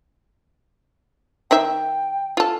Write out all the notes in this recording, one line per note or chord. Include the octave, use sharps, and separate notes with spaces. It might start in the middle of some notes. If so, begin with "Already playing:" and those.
D#3 D#4 E5 G5
F4 A4